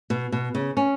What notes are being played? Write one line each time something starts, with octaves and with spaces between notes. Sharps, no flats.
B2
B2
C#3
C#4